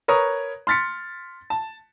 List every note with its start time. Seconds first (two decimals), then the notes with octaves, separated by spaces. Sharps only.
0.08 A#4 B4 C#5 A#5 D#6
0.67 C6 F6 A6 B6 C#7
1.50 A5